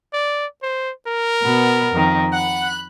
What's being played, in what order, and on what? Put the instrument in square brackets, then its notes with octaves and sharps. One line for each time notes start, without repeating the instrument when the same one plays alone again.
[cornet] D5
C5
A#4
[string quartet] B2 B3
F2 D#3
[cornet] F#5 [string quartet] B5 F#6